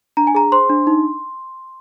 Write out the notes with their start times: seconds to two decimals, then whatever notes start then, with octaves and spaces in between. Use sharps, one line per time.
0.17 D4 A#5
0.27 G#5
0.35 G#4 A#5
0.52 C5 C6
0.69 D4
0.87 D#4